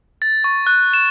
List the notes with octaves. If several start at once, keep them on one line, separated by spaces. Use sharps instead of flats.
A6
C#6
F#6
E7